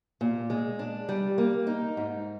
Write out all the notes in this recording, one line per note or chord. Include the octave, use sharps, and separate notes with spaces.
A#2
G#3
D4
G3
A#3
D#4
G#2